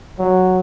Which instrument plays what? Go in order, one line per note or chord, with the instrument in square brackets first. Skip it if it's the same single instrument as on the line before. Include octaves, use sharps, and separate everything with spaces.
[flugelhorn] F#3